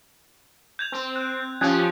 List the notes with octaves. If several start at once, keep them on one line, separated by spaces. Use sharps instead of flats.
G6 G#6 F7
C4
F#6
F3 C#4 G4 D#6 F#6 G#6